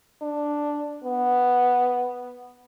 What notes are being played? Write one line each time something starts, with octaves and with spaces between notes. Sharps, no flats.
D4
B3